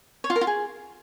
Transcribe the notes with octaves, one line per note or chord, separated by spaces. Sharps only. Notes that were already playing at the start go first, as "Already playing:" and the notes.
C#5
F4
A#4
F4
G#4